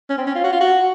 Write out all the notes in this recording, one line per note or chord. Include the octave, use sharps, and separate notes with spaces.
C#4
C4
C#4
F4
F#4
F4
F#4